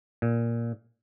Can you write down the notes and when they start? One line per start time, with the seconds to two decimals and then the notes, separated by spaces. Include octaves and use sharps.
0.22 A#2